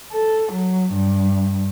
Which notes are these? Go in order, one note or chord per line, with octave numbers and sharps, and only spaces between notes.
A4
F#3
G2